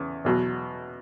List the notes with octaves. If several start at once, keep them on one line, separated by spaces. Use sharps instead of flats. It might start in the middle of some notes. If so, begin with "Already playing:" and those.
Already playing: E2 C#3
E2 B2 F#3